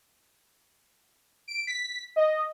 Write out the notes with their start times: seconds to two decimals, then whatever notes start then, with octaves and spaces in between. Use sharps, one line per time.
1.48 D7
1.67 B6
2.16 D#5